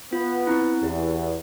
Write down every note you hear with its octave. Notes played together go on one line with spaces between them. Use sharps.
B3 F4
C4 E4
E2 G4